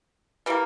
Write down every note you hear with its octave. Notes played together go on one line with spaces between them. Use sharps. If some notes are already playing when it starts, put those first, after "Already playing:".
E3 G3 A#3